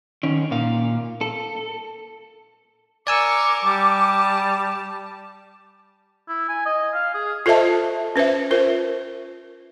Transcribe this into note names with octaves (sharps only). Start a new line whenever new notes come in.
D#3 C#4
A#2 F5
A4
A#4 D5 G#5 C#6 D6 E6
G3 A5
E4
G#5
D#5
F5
G#4
F4 A4 C5 D#5 E5 A5
C#4 B4 C5 E5
F4 A#4 C5